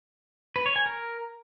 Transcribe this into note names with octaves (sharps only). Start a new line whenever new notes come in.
B4
C#5
G#5
A#4